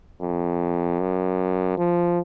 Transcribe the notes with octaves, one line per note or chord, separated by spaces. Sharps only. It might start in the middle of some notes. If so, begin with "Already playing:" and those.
F2
F#2
F3